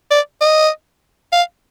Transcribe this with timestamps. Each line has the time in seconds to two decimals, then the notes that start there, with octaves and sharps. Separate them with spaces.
0.11 D5
0.41 D#5
1.33 F5